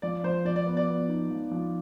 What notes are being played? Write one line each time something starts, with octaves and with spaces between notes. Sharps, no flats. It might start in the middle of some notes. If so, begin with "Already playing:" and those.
F3 D5
F3 C5
F3 D5
D5
B3
D5
B3
D#4
F3
F3